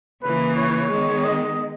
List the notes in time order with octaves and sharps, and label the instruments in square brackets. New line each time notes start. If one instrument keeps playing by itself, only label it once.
[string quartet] C#3 E3 A#3 [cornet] B4
[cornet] C#5
[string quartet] D#3 G#3 B3
[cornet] D#5